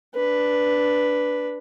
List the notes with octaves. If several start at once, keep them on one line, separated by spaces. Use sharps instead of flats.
D4 B4